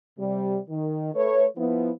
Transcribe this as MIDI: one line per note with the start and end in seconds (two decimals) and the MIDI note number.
0.18 0.58 48
0.18 0.58 55
0.70 1.11 51
1.14 1.44 57
1.14 1.44 71
1.14 1.44 73
1.57 1.91 53
1.57 1.91 59
1.57 1.91 64